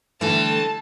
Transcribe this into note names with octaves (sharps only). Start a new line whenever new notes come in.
D3 E3 G3 A3 A5